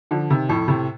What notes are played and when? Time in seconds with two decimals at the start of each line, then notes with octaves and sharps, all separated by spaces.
0.11 D3 F3
0.30 C3 D#3
0.49 F2 A2
0.68 A2 C3